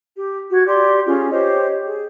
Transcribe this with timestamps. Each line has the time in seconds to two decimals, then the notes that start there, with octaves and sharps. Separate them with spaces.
0.16 G4
0.52 F#4 G#6
0.67 G4 D5 C6
1.05 C#4 F4 G4 G#4
1.30 G4 C5 C#5 D#5
1.85 G#4